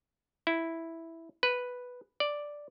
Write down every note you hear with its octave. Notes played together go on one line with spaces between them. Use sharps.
E4
B4
D5